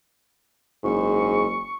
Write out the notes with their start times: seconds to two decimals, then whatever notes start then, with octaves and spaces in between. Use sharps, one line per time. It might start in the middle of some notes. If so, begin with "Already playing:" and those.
0.84 F#1 G#2 C#6